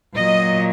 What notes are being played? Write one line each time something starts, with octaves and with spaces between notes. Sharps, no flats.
A#2 F#3 D#5